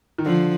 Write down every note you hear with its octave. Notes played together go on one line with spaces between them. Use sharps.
D#3
D3 F3